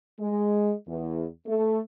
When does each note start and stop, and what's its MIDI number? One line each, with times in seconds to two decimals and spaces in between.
0.19 0.72 56
0.87 1.24 40
1.46 1.77 57